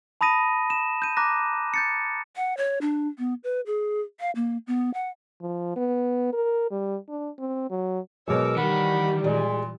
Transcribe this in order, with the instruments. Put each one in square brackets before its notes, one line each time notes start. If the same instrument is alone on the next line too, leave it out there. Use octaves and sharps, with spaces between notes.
[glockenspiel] A5 B5 D#6 A#6 D#7
E7
G6 D#7
A#5 D6 F#6 A#6
G6 A6 C#7
[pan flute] F#5
C#5
D4
B3
B4
G#4
F5
A#3
B3
F#5
[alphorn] F3
B3
A#4
G3
D4
C4
F#3
[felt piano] B2 F#3 G#3 [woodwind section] A#4 D6 E6 [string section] C#5
[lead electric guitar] D#3 [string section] E3 G3 [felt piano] A#4 [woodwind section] F#5 B5
[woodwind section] A#2 [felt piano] G#3 D5